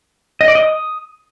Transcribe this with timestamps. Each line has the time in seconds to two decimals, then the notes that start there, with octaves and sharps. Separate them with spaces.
0.41 D#5
0.48 D5
0.55 D#5
0.63 D#6